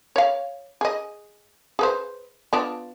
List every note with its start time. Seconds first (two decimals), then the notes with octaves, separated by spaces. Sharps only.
0.16 C#5 F5
0.81 G#4 D#5
1.79 G#4 B4 C5
2.53 B3 D4 F4